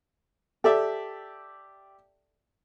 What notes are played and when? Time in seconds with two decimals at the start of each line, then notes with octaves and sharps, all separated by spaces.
0.64 G4 A4 D5 E5